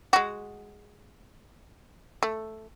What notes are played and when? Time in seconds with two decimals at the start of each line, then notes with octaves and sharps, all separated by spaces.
0.13 G#3 F#4
2.23 A3